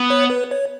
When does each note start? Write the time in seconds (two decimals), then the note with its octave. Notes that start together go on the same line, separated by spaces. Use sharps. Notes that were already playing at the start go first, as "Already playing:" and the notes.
Already playing: B3
0.10 C#5
0.30 B4
0.51 C#5